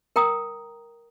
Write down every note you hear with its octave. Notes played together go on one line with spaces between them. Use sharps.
A#4 G5 A#5 D#6